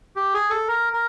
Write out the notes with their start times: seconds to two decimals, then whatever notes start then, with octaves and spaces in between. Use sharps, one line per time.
0.16 G4
0.34 G#4
0.50 A4
0.68 A#4
0.93 A#4